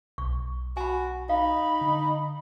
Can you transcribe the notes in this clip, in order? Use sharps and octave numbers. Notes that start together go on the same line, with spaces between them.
B1 C#6
F#4 G#5 B5
D#4 F5 B5
D3